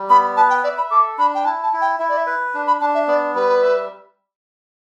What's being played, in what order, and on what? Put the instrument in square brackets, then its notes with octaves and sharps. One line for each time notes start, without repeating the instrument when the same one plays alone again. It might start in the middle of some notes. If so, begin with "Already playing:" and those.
Already playing: [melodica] G3
[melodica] B3 [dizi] B5
[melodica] B4 [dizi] A5
[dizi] G5
[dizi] D5 [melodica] E5
[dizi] B5
[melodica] A4 [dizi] D6
[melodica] D4 [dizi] B5
[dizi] G5
[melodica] E4 [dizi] A5
[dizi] A5
[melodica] E4
[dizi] G5
[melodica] E4 [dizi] E5
[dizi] D5
E5
[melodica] B4
D4
[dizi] B5
[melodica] D4 [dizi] A5
[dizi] E5
[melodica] B3 [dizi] D5
[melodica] G3 [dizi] B4
[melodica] E5